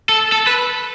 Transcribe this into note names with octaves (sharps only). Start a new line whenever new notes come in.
A4
A4
B4